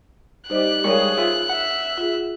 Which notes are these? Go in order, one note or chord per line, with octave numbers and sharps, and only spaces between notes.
G3 D#4 G4 C5 D#5 F#6
G3 G#3 G#4 A#4 C#5 F5 C#6
F4 C5 E5
E5 F#5
F4 G#4